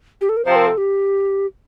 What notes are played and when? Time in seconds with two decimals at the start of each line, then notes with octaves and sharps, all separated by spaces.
0.21 G4
0.29 A4
0.37 A#4
0.45 C3 F3 C4 C5
0.56 A#4
0.67 A4
0.78 G4